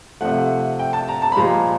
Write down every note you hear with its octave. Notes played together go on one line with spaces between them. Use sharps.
C3 F3 A3 F#5
G5
A5
A#5
A5
B5
A#2 F3 G#3 A#5